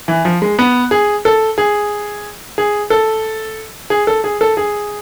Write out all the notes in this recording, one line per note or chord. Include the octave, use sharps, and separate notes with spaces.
E3
F3
G#3
B3
G#4
A4
G#4
G#4
A4
G#4
A4
G#4
A4
G#4